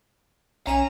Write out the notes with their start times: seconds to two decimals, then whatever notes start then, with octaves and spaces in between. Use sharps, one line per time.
0.67 B1 C#4 G#5 A#5 E7